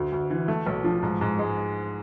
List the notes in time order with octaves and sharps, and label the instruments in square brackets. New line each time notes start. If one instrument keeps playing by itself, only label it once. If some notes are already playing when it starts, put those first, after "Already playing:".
Already playing: [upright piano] D2
D2
E3
A3
B1
F3
G#2
G#2
G#3